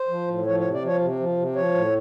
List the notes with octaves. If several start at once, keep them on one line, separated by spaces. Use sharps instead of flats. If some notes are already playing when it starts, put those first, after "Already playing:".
Already playing: C5
F3
A2
F3 C#5
C3 C#5
D5
F3 C#5
C3
F3
C3
F3 C#5
A2